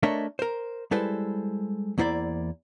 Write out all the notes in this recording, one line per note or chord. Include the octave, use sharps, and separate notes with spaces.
A3 D4 A#4 C#5 D#5 E5
A#4 C5
G3 G#3 E4 A4 B4 C5
E2 A#3 E4 C5 D5